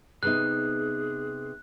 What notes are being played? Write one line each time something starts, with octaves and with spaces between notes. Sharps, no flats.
C3 B3 D#4 G#4 F#6